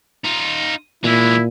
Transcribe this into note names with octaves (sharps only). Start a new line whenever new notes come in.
D#4 F4
A#2 E3 G#3 E4